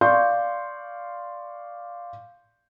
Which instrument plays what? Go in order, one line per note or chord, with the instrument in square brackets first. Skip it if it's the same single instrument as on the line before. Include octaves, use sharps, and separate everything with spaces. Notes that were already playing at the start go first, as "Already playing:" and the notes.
[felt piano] D5 F5 C6 C#6 G6